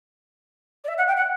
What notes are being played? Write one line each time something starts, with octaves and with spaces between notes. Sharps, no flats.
D5
E5
F#5
G5
F#5